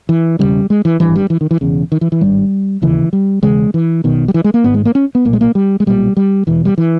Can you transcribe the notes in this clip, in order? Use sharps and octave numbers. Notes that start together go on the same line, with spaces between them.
E3
E1 D#2 C#3 G3
G#3
E3
G#1 G2 E3
G3
E3
D#3
E3
E1 E2 C#3
D#3
E3
E3
G#1 G2 G3
E1 D#2 C#3 E3
G3
E1 E2 C#3 G#3
E3
B1 B2 D#3
G3
E3
G#3
A#3
G#1 G#2 B3
G#3
A#3
C#4
B3
B1 A#2 A#3
G#3
A#3
G3
G#3
B1 A#2 G3
G3
E1 E2 B2 E3
G3
E3